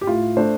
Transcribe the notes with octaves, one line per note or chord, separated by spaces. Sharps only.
G4
A2 F4
A3 D4 C5